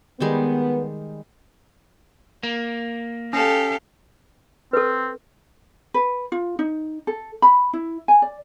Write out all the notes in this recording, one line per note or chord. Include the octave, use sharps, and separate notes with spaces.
D#3 G3 G#3 B3
A#3
C#4 G4 A4 F5
C4 A4 B4
B4
F4
D#4
A4
B5
E4
G#5
D5